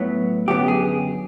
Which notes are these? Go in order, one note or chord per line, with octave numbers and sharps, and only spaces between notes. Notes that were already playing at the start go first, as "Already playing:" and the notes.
Already playing: A2 F#3 B3
F#2 D3 F#3 B3 G4
G#4